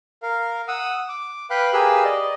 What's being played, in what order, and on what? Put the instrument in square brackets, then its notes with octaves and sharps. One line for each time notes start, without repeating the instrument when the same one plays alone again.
[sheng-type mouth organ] A#4 F5
F#5 D#6 E6
D6
B4 F5 G5 B5 F#6
G4 G#4 A#4 B4 F5 E6
D5 D#5